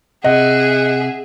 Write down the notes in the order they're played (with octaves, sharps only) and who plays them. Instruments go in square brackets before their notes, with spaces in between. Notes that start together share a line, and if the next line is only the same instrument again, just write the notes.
[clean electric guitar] C3 [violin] G#4 E5 [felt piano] D#5 [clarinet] F#5